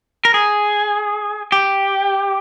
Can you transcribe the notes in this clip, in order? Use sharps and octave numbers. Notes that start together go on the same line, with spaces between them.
A#4
G#4
G4